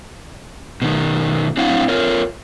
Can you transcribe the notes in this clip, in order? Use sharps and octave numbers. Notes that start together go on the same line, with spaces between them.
B2 D#3
F#3 C4 D4 E4 F5 F#5
F4 A#4 C#5